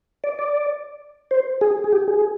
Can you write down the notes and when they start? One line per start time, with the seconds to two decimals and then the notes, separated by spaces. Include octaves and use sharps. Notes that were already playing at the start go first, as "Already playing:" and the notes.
0.24 D5
0.39 D5
1.31 C5
1.61 G#4
1.84 G#4
1.93 G4
2.08 G#4